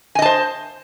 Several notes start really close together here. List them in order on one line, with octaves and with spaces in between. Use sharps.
G#5 D#5 A5 C5